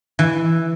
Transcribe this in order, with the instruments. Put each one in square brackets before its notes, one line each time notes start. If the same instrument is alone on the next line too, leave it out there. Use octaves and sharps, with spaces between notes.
[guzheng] E3